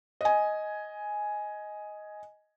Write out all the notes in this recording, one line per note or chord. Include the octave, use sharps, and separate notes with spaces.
D#5 G#5